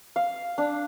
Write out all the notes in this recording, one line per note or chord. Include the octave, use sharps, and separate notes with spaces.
F5
D4